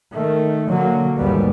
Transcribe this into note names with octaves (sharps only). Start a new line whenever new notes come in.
D#3 A3
D3 F#3 A#3
A#1 D#2 G#2 G3 B3